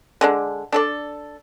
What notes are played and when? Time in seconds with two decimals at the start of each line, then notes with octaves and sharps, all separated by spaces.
0.21 D3 G#3 D4
0.72 D4 A4 D5